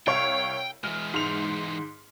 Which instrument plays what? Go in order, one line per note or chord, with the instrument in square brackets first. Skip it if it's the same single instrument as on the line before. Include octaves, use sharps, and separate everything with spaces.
[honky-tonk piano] C2 C#5 F5 [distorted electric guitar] G5
[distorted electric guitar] E3 G#3 [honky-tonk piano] F6
[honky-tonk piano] G#2 F7